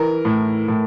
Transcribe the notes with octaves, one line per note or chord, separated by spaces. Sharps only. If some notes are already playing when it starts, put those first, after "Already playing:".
Already playing: E3 A#4
A2
A2